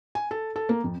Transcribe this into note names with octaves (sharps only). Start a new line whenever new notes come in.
G#5
A4
A4
A#3
F2